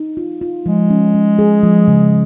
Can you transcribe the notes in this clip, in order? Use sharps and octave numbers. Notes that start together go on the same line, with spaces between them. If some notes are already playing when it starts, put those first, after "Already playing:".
Already playing: D#4
F4
F4
F3 G#3
C#4
C#4
G#4
F3
C#3